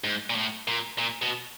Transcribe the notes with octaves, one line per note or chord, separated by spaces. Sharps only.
G#2
A#2
A2
A#2
A#2
B2